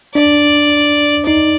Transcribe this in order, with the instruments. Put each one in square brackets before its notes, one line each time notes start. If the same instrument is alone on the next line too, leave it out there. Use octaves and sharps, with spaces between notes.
[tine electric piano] D4 [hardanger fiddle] D5
[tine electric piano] D#4 [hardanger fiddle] D5